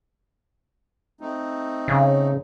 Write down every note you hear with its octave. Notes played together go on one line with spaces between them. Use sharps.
A3 C4 D#4
C#3